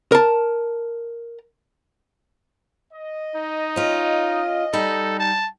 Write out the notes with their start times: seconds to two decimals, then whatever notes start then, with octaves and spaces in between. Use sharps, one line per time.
0.12 A#4 A5
2.93 D#5
3.36 D#4
3.76 C#4 F4
4.73 G3 D#4 A4
5.20 A5